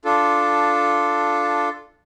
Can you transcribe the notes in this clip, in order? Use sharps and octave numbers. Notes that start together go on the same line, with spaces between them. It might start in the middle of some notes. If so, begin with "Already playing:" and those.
D4 F4 A4